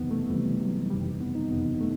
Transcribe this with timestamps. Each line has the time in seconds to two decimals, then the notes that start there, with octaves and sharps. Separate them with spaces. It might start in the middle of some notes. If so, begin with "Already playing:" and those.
Already playing: F#1 E2 C3 D#3 B3
0.11 A3
0.30 F#1 E2 C3 D#3 G3
0.60 F#3
0.90 F#1 E2 C3 D#3 G3
1.20 B3
1.35 D#4
1.50 F#1 E2 C3 D#3 B3
1.81 A3